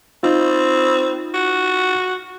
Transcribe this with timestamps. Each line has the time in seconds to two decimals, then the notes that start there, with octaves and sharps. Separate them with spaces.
0.23 C4 D#4 F4
1.34 F#4